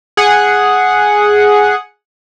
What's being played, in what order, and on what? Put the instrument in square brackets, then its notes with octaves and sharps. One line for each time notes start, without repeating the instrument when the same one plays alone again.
[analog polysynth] G#4 F#5